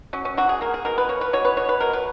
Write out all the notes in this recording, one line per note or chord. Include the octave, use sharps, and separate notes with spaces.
F#3 C#4
C#4
F#3 F#4
G#4
A#3 A#4
G#4
B2 A#4
B4
A#3 C#5
B4
B2 C#5
B4
B2 C#5
B4
B2 A#4
B4